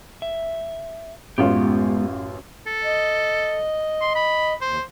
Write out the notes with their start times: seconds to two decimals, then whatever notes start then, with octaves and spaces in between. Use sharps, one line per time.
0.22 E5
1.38 A1 F#2 G#3 B3 F4 G4
2.67 A4
2.84 D#5
4.01 C6
4.15 B5
4.61 D#2 C5